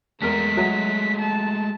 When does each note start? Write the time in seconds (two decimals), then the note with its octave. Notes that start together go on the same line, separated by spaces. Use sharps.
0.22 E2 G#3 A3 A#4 B6
0.57 F#3 F#4 E5
1.20 A5